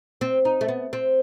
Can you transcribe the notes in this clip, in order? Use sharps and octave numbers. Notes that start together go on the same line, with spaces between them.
C4
D#4
A3
B3
C4